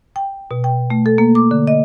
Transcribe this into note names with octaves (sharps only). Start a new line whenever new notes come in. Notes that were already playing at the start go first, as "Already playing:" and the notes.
G5
B2
G5
A3
A4
A#3
D6
D3
D#5